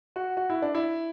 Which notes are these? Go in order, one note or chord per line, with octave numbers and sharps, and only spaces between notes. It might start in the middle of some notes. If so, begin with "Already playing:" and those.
F#4
F#4
E4
D4
E4